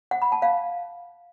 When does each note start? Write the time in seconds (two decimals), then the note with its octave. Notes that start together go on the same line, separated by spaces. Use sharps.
0.11 F#5
0.22 B5
0.32 A5
0.42 F5